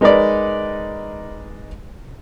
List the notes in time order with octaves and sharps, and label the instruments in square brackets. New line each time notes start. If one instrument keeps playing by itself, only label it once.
[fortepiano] G#3 D#4 A#4 B4 D5